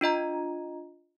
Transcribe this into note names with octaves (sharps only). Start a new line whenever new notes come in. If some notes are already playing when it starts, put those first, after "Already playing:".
D4 F4 D#5 A#5